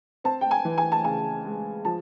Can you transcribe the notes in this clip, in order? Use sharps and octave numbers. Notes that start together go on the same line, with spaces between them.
C4 A5
G5
G#5
E3
G#5
A5
C#3 G#5
G#3
F3 A5